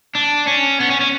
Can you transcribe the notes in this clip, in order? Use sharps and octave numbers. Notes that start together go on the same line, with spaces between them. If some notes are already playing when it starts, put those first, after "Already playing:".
D4
C#4
B3
C#4
C#4